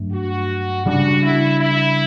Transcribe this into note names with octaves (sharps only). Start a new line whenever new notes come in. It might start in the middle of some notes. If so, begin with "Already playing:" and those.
Already playing: G2 F#3 A3 D4
F#4
C#3 G3 B3 D4 F#4
E4
E4